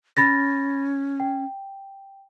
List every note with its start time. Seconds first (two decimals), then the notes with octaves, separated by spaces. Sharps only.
0.17 C#4 B5 A6 A#6
1.20 G5